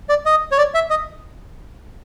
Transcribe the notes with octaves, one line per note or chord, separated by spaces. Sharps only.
D5
D#5
C#5
D5
E5
D#5